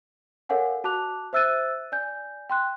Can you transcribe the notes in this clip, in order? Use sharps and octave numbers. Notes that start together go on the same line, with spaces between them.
A4 A#4 C#5 F5 F#5 G#5
F#4 A5 D6 F#6 F7
C5 E5 E6 F#6 A6 D#7
D5 G#5 G6
G5 C6 F#6